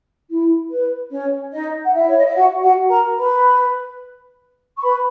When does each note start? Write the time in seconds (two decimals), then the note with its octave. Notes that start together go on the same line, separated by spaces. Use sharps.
0.28 E4
0.70 B4
1.10 C#4 C#5
1.52 D#4 D#5
1.84 F#5
1.94 E4 E5
2.08 C#5
2.17 D#5
2.26 E5
2.34 F#4 F#5
2.62 F#4 F#5
2.89 A#4 A#5
3.17 B4 B5
4.77 C#6
4.82 B4 B5